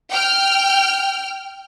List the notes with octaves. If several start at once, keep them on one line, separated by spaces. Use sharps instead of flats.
G5 F6